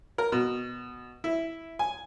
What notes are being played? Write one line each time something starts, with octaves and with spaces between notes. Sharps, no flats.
A#4
B2
E4
G#5